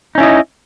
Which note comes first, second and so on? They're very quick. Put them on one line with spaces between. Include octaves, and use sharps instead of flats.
D#4 C#4 E4 D#5